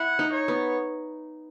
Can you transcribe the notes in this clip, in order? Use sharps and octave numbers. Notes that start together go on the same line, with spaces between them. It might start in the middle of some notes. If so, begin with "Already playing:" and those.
Already playing: E4 F#5
D#4
C#5
B3